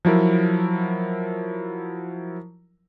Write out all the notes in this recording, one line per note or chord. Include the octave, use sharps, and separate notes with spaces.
F3 F#3 E4 A#4